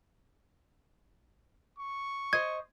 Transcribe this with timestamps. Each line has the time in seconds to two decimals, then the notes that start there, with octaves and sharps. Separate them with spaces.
1.78 C#6
2.33 C5 D#5 G#6